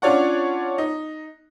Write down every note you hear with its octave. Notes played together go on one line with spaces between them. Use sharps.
C#4 D4 F4 C#5 D5 F#5
D#4